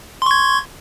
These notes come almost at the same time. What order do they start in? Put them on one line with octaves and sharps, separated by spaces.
C6 C#6 G#6